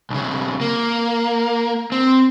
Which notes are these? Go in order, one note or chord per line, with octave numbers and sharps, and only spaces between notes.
B1 C#3
A#3
C4